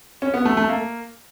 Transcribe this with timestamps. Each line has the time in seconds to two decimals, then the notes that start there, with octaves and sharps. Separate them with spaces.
0.22 C#4
0.34 B3
0.45 A3
0.57 A3
0.69 A#3